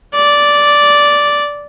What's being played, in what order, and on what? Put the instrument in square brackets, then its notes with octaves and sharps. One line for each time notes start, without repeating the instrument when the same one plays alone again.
[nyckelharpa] D5